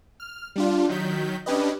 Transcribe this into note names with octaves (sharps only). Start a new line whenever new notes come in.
F6
G3 D4 F4
D#3 F#3 G6 B6
C#4 D4 G4 B4 D#5